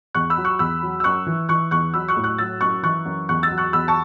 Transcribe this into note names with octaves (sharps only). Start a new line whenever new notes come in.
E2 C#6 F#6
B5 E6
F#3
C#6 F#6
E2 B5 E6
F#3
E6
F#2 C#6 F#6
E3
E3 C#6 F#6
E2 C#6 F#6
F#3 B5 E6
C#6 F#6
A2
C#6 F#6
F#3 E6 A6
F#2 C#6 F#6
E3 C#6 F#6
F#2
E2 C#6 F#6
E6 A6
F#3
C#6 F#6
E2 B5 E6
A5 C#6